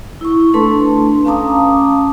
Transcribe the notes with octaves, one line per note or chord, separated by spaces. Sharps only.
E4 C#6
A3 D4 A4 B4 A5 C6
C#4 F5 A5 A#5 D6 D#6